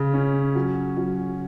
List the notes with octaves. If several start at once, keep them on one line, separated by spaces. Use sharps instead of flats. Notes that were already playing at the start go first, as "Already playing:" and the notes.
Already playing: C#3
C#4
F#3
F#3